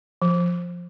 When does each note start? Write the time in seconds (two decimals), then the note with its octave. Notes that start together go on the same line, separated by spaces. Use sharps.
0.22 F3